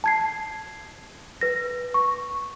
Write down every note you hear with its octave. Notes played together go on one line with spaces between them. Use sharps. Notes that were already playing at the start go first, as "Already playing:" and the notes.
A5 G#6 C7
B4 A#6
C#6